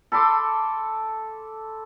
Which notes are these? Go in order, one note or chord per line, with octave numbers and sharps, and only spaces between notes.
A4 B5 C6 D6